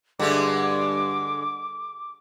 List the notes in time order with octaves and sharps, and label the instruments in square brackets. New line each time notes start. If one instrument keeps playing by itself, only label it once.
[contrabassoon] G2 [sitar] D3 G#3 A3 [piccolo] D6